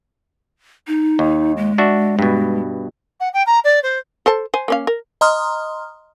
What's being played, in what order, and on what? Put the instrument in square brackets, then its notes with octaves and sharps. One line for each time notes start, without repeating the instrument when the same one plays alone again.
[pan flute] D#4
[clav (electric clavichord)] D#2
[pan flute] G#3
[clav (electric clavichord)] D4 F#4 E5
G2 B2
[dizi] F#5
G5
A#5
D5
C5
[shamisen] A4 C5 A5
C5 G#5
A#3 C#4 F5
A#4
[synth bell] D#5 A#5 C6 D#6 F6